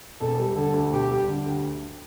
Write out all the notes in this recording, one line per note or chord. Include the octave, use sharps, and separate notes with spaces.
E1 A4
G3
D3 A4
D2
E1 G4
G3
D3
D2